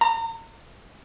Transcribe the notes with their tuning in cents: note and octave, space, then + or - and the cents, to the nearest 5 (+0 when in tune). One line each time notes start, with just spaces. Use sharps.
A#5 -40